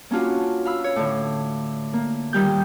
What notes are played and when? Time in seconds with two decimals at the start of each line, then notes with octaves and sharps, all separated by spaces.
0.10 A#3 C#4 D4 F4 F#4
0.65 F5 B5 E6
0.84 C#5
0.96 A2 D3
1.94 A#3
2.33 A#2 D#3 G3 G6